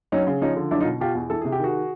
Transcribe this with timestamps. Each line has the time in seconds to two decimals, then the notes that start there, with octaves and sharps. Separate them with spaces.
0.12 F#3 C#4 D#4
0.27 C#3
0.42 F3 C#4 D#4
0.56 D3
0.71 F#3 D4 E4
0.80 D#4 F4
0.86 B2
1.00 B2 F4 G4
1.15 E2
1.30 E3 A4
1.42 C3 G#4
1.52 G4
1.60 D#3 F#4 G#4